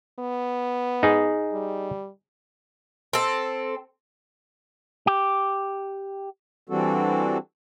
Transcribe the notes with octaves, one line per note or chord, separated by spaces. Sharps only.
B3
D#4 G#4
G3
C4 A4
G4
E3 G3 C4 D4 F#4 A4